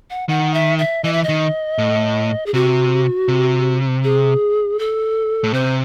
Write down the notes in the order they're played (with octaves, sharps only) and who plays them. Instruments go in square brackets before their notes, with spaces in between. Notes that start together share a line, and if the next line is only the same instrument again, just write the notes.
[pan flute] F#5
[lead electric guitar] D#3 [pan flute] F#5
[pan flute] E5
E5
[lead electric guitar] E3 [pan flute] D#5
[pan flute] E5
D#5
[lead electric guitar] D#3
A2
[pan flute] G#4
[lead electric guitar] C3 [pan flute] F#4
[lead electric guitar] C3
[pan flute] G#4
A4
[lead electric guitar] A2
[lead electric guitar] C3 [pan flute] C5